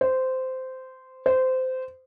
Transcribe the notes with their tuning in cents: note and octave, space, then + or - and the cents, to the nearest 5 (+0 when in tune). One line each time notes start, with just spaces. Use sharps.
C5 -15
C5 -20